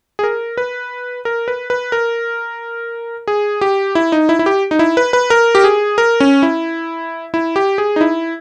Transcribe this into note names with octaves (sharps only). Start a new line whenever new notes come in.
G#4
A#4
B4
A#4
B4
B4
A#4
G#4
G4
E4
D#4
E4
E4
G4
D#4
E4
B4
B4
A#4
G4
G#4
A#4
C#4
E4
E4
G4
G#4
D#4
E4